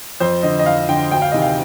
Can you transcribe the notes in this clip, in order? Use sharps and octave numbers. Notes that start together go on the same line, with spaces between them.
F2 C5
D3 D#5
D#5
F2 F5
D3 G5
D2 G5
F5
C3 D#3 D#5
F5